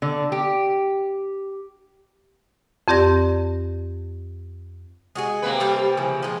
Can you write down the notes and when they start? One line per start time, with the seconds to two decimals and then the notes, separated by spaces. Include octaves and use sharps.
0.02 D3
0.32 G4
2.88 F2 C4 G4 D5 A#6
5.15 G#3 F#4 G#4
5.42 C3 A#3 B4
5.60 G3 A4 A#5
5.97 C#3 E3 F3
6.23 F3 G#3